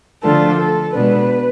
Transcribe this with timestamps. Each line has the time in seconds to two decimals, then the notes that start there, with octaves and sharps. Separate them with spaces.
0.23 D3 F3 A3 D4 F4 A4
0.58 A4
0.94 B2 G#3 B3 D4 B4